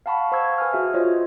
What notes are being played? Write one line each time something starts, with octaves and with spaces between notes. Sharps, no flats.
F5 F#5 A5 B5 C#6
C5 F5 C#6 E6 G#6
B4 G#5 F6
F#4 G#4 E5
F4 C5 C#5 D#5